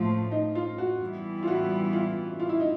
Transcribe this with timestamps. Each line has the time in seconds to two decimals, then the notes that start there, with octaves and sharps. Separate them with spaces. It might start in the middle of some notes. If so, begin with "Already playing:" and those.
Already playing: A2 F3 A3 F4
0.32 D#4
0.55 F4
0.78 F#4
1.01 E3 G3 B3 E4
1.43 F4
1.47 F#4
1.93 F4
2.40 F4
2.49 E4
2.60 D#4